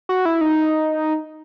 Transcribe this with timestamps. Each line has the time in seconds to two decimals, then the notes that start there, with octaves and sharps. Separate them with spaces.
0.09 F#4
0.25 E4
0.41 D#4